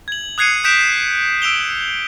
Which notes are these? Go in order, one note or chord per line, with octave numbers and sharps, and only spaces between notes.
G#6 F#7
D#6 F#6 G#6 C7 C#7 D#7
D#6 F#6 G6 B6 D7 E7
E6 D7 F7 G7